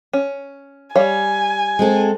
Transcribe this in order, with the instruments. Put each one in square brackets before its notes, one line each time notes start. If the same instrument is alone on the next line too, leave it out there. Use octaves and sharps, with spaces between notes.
[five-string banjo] C#4
[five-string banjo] G3 C#5 F5 [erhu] G#5
[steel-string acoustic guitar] G#3 C4 A4